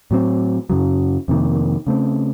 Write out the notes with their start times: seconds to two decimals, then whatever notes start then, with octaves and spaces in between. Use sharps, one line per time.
0.11 A2 F#3 C4
0.70 F#2 C#3 F#3
1.28 F2 C3 D#3 A#3
1.87 C#3 A3 C4